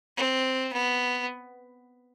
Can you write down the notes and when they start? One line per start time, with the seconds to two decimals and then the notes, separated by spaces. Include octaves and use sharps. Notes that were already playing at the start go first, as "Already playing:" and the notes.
0.17 C4
0.73 B3